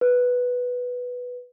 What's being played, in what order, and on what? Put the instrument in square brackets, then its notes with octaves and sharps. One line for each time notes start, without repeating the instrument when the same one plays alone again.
[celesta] B4